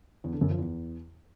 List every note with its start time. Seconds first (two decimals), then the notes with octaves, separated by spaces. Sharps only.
0.24 E2
0.33 D3
0.41 F#2
0.50 F3
0.59 E2